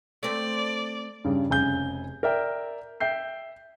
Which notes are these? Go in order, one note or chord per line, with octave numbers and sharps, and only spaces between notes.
A3 C4 D5
G2 C#3
F1 C#3 G#5 G6
A#4 D5 E5 G5
E5 G5 G6 C7